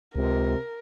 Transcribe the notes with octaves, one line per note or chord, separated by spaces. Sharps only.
C#2 C3 A#4